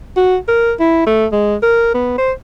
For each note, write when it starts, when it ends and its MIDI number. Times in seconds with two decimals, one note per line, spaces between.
0.17 0.36 66
0.48 0.72 70
0.80 1.01 64
1.06 1.26 57
1.32 1.55 56
1.62 1.90 70
1.94 2.14 59
2.18 2.32 72